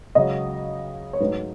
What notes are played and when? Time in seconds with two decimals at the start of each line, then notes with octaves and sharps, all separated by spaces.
0.15 C#2 C#3 F#3 D#5
1.13 C#5
1.20 G#2 F#3 A3 D#4 B4